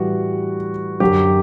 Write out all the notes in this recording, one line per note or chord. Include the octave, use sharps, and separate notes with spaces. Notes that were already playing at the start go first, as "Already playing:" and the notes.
Already playing: A2 E3 G3 F#4
F#2 D3 F#3 G4